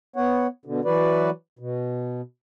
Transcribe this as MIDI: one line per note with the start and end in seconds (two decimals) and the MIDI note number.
0.16 0.47 59
0.16 0.47 73
0.16 0.47 78
0.65 0.81 47
0.65 0.81 50
0.85 1.30 52
0.85 1.30 54
0.85 1.30 66
0.85 1.30 71
0.85 1.30 74
1.59 2.21 47